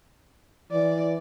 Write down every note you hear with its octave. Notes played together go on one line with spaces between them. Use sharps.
E3 D5